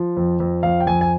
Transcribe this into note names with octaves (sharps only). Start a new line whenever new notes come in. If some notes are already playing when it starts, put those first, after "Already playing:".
Already playing: F3
F2
F2
F2 F5
G5
F2 G#5
G#5